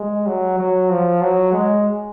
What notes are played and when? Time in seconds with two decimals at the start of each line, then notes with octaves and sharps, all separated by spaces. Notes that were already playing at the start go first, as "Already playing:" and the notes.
Already playing: G#3
0.27 F#3
0.58 F#3
0.90 F3
1.21 F#3
1.53 G#3